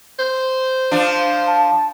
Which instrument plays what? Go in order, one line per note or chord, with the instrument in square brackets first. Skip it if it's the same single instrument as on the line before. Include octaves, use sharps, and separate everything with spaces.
[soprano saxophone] C5
[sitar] F3 D4
[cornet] A5